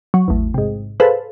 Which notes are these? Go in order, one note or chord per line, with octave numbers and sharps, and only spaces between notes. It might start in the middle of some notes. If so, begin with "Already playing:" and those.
F#3
A1 E2
G#2 C3
G#4 A4 B4 C5 F5